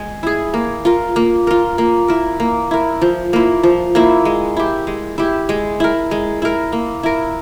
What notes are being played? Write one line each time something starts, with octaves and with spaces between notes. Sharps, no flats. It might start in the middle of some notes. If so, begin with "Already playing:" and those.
Already playing: G#3 G#4
E4 G#4
A#3
F4 A#4
A#3
F4 A#4
A#3
E4 A#4
A#3
E4 A#4
F3
A#3 E4
F3
A#3 E4
G#3
E4 G4
G#3
E4 G4
G#3
E4 A#4
G#3
E4 A#4
A#3
E4 A#4